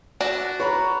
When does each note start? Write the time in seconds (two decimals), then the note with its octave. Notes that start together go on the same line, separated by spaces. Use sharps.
0.21 D4 F#4
0.60 C#5 A#5 B5 C#6